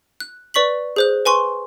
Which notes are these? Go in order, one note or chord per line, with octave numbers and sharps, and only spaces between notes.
F#6
B4 D5 C#6 B6 F#7
G#4 C5 F#6
B4 G#5 C6 C#6